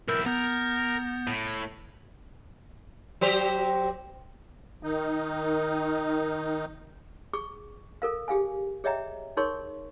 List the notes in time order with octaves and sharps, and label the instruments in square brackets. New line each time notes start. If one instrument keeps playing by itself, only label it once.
[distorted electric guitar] B1 E4 [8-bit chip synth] A#4 E6 G6
[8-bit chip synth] B3 G6 [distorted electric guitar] A#4
[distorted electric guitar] A2
[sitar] F#3 G4 C5
[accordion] D#3 D#4
[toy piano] G#4 C#6 D6
A4 A#4 F5
G4 G#4 F5 G#5
G#4 C#5 D#5 E5 G5 A#5
D#4 G#4 A#4 C#5 C6 C#6